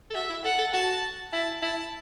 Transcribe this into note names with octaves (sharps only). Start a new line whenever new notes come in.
A4
F#4 E5
E4
A4 F#5
A4
F#4 A5
E4 A5
E4 A5